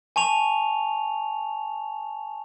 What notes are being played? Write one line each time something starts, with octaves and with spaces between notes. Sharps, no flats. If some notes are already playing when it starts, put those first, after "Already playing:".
G#5 A5 C#6 F7